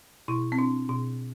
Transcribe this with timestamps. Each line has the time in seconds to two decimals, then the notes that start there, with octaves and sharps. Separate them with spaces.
0.28 B2 E4
0.52 C4
0.59 D4
0.89 B2